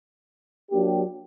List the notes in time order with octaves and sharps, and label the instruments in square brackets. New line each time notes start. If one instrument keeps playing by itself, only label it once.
[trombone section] F#3 A#3 D4 G4